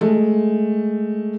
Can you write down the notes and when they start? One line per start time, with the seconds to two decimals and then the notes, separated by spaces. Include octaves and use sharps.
0.01 G#3 A3